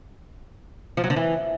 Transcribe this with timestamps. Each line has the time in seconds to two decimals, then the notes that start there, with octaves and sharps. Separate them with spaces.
0.97 F3
1.04 F#3
1.10 D3
1.16 E3